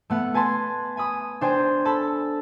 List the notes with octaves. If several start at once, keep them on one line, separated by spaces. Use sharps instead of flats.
A3 B3 F#5
B4 G#5 A5 C6
G#5 B5 D#6
D4 C5 G5 G#5
A4 A5 B5